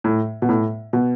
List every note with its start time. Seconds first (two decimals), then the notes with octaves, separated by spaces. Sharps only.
0.04 A2
0.42 B2
0.49 A2
0.93 B2